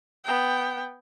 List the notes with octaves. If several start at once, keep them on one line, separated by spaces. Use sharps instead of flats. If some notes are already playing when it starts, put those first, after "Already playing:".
B3 G5